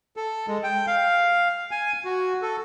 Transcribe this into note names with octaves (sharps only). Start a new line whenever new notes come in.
A4
G#3
G5
F5
G#5
F#4
A4